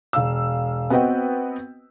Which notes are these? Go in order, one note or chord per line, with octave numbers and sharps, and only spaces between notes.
E1 F5 E6
B3 C4 F#4 B4 D#5 G5